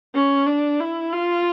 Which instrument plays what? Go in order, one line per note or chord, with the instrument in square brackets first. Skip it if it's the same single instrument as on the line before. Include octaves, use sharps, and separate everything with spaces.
[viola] C#4
D4
E4
F4